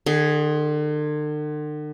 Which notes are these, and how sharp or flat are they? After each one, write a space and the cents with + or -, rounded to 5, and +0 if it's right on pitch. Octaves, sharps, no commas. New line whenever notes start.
D3 +45 G#4 +0